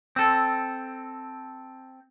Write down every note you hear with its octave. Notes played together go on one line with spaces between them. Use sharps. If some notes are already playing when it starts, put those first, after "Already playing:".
C4 A4